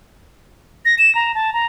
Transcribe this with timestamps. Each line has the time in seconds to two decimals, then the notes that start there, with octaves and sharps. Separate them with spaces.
0.85 A#6
0.98 E7
1.15 A#5
1.35 A5
1.54 A#5